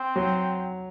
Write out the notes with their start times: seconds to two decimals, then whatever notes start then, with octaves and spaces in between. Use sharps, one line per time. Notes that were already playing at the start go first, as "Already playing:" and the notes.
Already playing: C4
0.16 F#3